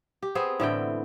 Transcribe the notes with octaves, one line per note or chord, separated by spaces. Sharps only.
G4
B3 C4 G#4
A2 D3 E3 G5